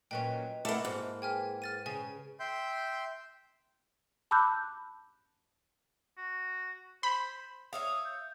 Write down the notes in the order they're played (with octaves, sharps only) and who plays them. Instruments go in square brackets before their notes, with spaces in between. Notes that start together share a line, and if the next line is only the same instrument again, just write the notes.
[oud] A#2 F#3 C#4 [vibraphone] B4 D#5 [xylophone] G5
[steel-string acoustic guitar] A3 F#5 [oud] A#3 E4 A#4 [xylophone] A5 B5 D6
[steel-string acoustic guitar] G#2
[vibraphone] G#4 B4 [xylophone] G5 G#5 F6
[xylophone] F6 A6 D#7
[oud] C#3 [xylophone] G#5
[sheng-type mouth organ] E5 G5 C6 G6
[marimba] A5 B5 D6 E6 F#6 G6
[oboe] F#4
[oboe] C5 [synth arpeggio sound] B5
[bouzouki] C#5 E5 F5 [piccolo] D#6
[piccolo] G6